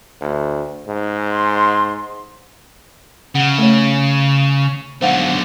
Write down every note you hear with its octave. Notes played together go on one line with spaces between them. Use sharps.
D2
G#2
C6
C#3 F#5
A3 C#5
B1 D3 C5 F5 F#5